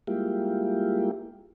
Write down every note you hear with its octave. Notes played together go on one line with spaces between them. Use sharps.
G3 G#3 A#3 E4 F4 G4